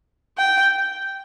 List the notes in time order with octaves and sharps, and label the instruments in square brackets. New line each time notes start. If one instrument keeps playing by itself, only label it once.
[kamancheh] G5